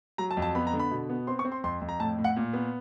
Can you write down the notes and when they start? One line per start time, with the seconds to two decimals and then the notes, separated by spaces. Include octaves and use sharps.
0.18 F#3 A#5
0.31 A5
0.37 F2
0.42 A5
0.55 B3 B5
0.67 A#5
0.73 D3
0.79 B5
0.91 B2
1.09 B3
1.27 C4 C6
1.39 C#6
1.45 C4
1.52 C6
1.64 F2 C6
1.81 F2
1.89 A#5
1.99 A2 A5
2.18 A2
2.24 F#5
2.36 A#2
2.53 B3